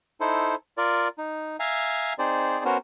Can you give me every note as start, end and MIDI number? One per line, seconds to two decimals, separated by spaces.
0.20 0.55 63
0.20 0.55 64
0.20 0.55 69
0.20 0.55 72
0.78 1.08 65
0.78 1.08 70
0.78 1.08 74
1.18 1.56 63
1.60 2.13 76
1.60 2.13 77
1.60 2.13 80
1.60 2.13 82
2.19 2.64 60
2.19 2.64 63
2.19 2.64 68
2.19 2.64 72
2.19 2.64 74
2.65 2.77 59
2.65 2.77 61
2.65 2.77 66
2.65 2.77 70
2.65 2.77 72